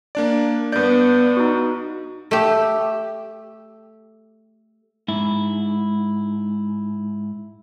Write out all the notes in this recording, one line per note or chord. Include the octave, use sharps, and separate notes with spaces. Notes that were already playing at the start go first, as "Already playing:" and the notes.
A#3 D4 D5
G2 B3 D5 G6
D#4 F#4
A3 G4
G#2 E4